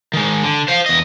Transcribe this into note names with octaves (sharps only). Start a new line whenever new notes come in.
D#3 G#3
D3
C5 F5
E2 D#5